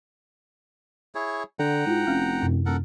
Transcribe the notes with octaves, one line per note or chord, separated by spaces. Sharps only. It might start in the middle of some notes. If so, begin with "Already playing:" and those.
E4 G#4 C#5
D3 F#5 G5 A#5
G#2 E4 F4
F1 C#4 F5 F6
F#2 C3
D#1 A4 A#4 F#5